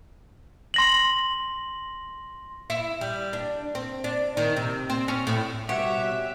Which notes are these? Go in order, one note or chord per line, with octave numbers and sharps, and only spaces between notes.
C6 A#6 F#7
E4
G3
D4
C4
D4
D#3
C3
C4
C#4
A2
B2 G3 F#4 G4 C#5 E5 F#5